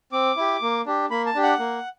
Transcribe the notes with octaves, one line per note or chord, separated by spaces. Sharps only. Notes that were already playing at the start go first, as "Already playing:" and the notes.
C4 D6
E4 G4
A#3
D4 G4
A#3 B5
A5
D4 G4
F#5
A#3